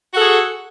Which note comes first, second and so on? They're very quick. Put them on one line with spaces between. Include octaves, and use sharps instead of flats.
F#4 F#5 A4 G#4